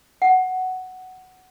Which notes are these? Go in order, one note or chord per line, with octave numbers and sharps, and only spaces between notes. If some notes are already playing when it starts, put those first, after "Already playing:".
F#5